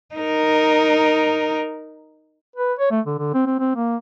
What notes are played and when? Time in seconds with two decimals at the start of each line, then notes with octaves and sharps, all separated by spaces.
0.15 D#4 A#4
2.56 B4
2.79 C#5
2.91 A3
3.06 D3
3.18 D3
3.34 C4
3.46 C4
3.60 C4
3.76 A#3